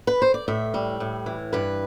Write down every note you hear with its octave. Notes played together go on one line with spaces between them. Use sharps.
B4
C5
D5
A2 E5
G3
A2
E3
G2 B4